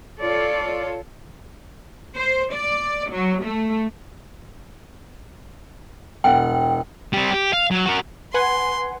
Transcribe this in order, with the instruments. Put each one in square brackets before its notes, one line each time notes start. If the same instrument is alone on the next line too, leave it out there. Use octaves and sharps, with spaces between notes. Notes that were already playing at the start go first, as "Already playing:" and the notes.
[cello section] F4 A4 C#5 [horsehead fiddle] D5
[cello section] C5
D5
F#3
A3
[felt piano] E1 F#5 [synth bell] G5
[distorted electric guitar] G3 C4
G4
F5
F#3
F#4 A#4
[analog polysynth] B4 F#5 G#5 [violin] C6